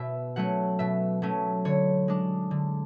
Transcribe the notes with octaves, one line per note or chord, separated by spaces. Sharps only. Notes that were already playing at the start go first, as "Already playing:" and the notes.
Already playing: B2 E5
F#3 A3 C#4 F#5
B2 E5
F#3 A3 C#4
D3 C#5
G#3 D4
D3